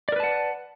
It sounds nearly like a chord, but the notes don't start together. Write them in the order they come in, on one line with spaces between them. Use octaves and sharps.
D5 A#4 B4 A5 F#5